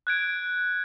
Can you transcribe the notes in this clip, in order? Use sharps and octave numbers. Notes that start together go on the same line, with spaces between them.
F#6 G#6 D7